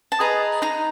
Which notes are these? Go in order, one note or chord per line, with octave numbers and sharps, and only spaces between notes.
A5
G#4 B4 D#5 A#5
D#4 A#5